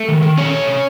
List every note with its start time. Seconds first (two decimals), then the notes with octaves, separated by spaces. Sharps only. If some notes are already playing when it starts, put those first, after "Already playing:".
Already playing: A3
0.08 D#3
0.22 D#3
0.37 A3 C#4 C#5
0.52 C#4
0.67 C3